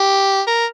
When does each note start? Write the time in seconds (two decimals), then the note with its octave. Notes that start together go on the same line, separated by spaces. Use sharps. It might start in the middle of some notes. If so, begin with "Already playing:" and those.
Already playing: G4
0.47 A#4